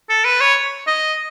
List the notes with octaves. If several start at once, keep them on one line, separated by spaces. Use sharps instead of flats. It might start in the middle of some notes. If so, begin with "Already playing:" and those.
A4
B4
C#5
D#5